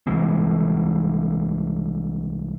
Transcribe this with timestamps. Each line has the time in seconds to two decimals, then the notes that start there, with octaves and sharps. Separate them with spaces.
0.07 C2 E3 G#3 C4